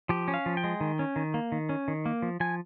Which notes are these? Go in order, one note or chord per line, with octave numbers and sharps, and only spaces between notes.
F3 G4
C#4
F5
F3
G5
G#3
D#3
C#4
D#3
A#3
D#3
C#4
D#3
A#3
F3
F3 G#5